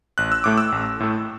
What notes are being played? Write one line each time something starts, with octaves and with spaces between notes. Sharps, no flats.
A1 F#6
E6
A2 A3 D6
E6
A1
A2 A3